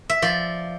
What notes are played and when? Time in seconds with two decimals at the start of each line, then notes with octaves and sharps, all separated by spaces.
0.10 E5
0.22 F3 D5